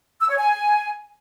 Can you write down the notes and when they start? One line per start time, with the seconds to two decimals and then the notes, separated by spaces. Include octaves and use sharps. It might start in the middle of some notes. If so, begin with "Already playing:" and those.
0.21 E6
0.30 C#5
0.38 G#5